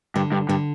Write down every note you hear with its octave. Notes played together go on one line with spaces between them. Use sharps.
G2 D3
G2
G2 D3